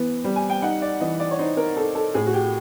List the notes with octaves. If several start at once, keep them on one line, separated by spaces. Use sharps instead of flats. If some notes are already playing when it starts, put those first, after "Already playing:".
Already playing: E3 B3
G3
G#5
G5
D#4 F#5
D5
E3 D#5
D5
C#5
D#4 C5
A#4
D#4 A4
A4
A2 G#4
F#4
G4